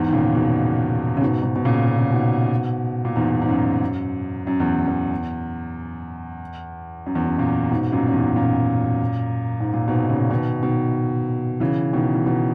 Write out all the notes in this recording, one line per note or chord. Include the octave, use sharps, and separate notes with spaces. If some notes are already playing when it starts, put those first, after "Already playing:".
Already playing: E2 G#2
D#3
A#2 C#3
B2 D#3
C#3
G#2 B2
G#2 B2
B2
A#2 C#3
B2
C#3
G#2 B2
A#2
E2 G#2
G#2
F#2
F#2
E2
E2
F#2
E2
F#2
F#2 A#2
G#2 B2
F#2 A#2
F#2
E2 G#2
F#2 A#2
G#2
A#2
G#2 B2
A#2 C#3
B2 D#3
B2 D#3
C#3 E3
B2 D#3
E3
B2 D#3